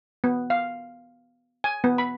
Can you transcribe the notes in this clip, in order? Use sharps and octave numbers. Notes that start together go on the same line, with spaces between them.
B3
F5
G#5
B3
B5